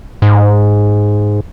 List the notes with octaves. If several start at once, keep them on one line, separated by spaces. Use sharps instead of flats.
G#2